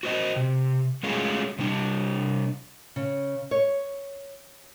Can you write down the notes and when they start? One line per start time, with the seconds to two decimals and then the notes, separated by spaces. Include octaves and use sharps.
0.03 F#4 C5 D#5
0.36 C3
1.03 G#3 A3 C#4 F4 F#4 G#4
1.59 C3 G3 D4
2.96 C#3
3.51 C#5